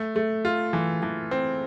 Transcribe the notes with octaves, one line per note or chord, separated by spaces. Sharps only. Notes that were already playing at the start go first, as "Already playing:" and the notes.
Already playing: A3
A3
F4
E3
E3
C4